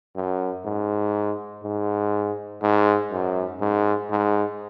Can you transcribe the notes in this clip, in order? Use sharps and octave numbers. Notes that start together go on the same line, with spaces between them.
F#2
G#2
G#2
G#2
F#2
G#2
G#2